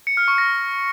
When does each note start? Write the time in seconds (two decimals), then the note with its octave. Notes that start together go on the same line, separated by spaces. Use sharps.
0.07 C#7
0.17 F6
0.28 C#6
0.38 A#6